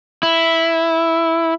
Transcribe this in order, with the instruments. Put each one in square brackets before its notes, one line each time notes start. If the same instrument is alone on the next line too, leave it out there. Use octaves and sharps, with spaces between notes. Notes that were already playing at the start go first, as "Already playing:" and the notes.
[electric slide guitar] E4